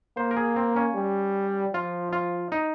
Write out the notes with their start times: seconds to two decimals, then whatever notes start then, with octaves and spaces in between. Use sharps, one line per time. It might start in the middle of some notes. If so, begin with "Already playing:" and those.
0.17 A#3 C5
0.31 A#4
0.37 G#4
0.56 C4
0.76 C#4
0.95 G3
1.73 F3 F4
2.13 F4
2.52 D#4